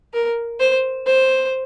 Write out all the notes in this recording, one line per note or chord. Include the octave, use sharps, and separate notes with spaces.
A#4
C5
C5